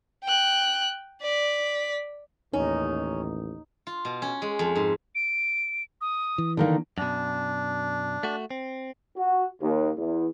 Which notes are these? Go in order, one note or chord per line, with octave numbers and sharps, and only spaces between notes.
G5 F#6
D5 B6
A1 D#2 C#4 D#4
F4
B2
C#4
G#3
F2
G#2
D7
D#6
E3
D3 D#3 A#3
F#2 B2 D4
A3 F#4
C4
F#4
D#2
E2